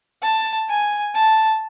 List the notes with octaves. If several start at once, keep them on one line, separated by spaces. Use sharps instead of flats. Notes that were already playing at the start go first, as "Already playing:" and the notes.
A5
G#5
A5